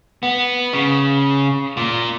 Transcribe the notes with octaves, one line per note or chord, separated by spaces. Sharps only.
B3
C#3
A#2